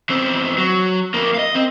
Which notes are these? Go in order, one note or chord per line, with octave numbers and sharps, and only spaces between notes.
E2 C4
F#3
F2 A#3
D#5 F5
C4